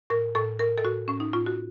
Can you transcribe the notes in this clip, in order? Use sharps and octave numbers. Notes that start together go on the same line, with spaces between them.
A2 A#4
A2 A4
A2 A#4
A4
A2 F#4
A2 C#4
D#4
A2 F4
F#4